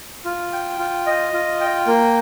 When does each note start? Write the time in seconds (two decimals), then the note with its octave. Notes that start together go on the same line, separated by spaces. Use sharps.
0.25 F4
0.53 G5
0.79 F4
1.07 D#5
1.33 F4
1.61 G5
1.87 A#3